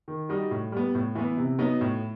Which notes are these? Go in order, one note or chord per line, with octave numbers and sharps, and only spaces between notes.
D#3
G3 D#4 F#4
A2
G3 B3
A2
E3 B3
C3
F#3 B3 D#4
A2